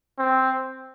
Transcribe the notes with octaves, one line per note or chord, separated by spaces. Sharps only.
C4